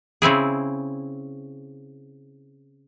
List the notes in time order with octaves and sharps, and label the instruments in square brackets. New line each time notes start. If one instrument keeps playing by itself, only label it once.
[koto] C#3 C4 E4 G#4